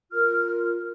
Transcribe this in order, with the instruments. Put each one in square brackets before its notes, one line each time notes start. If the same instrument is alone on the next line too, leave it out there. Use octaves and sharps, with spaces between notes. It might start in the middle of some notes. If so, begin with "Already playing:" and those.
[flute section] F4 A#4 F6